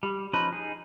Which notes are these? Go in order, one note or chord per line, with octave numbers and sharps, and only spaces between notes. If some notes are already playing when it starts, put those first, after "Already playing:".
G3
F3 C#4 D#4 B4
D#4 G#4